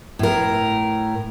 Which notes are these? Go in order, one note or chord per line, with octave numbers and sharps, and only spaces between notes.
A2 A#4